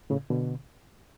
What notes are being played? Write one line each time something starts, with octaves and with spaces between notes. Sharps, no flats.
A2 C#3
B2 D3